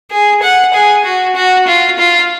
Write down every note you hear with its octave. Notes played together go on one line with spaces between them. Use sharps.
G#4
F#5
G#4
F#4
F#4
F4
F4